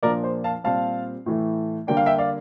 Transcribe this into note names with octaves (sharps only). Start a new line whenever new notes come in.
A#2 F3 A#3 D4 A#4 D5
C5
F5 A5
A#2 G3 C4 F5 A5
A2 E3 A3
D3 G3 A#3 D4 G5
F5
E5 G5
D5 F5